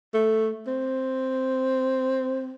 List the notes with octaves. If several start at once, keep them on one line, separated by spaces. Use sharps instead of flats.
A3
C4